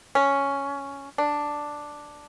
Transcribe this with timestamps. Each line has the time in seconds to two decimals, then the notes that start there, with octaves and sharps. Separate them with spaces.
0.15 C#4
1.18 D4